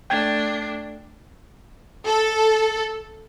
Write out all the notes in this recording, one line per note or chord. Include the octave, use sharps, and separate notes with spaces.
A3 D4 G5 G#6
A4